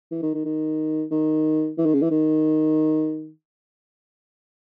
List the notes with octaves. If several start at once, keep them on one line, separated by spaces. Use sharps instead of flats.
E3
D#3
D#3
D#3
D#3
E3
D#3
C#3
E3
D#3